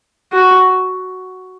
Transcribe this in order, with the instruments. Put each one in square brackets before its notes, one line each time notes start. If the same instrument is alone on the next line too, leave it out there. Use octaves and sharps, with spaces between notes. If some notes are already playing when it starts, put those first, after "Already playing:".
[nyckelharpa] F#4